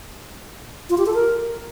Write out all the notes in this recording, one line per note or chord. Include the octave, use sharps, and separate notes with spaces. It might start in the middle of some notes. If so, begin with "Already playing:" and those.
F4
G4
A4
A#4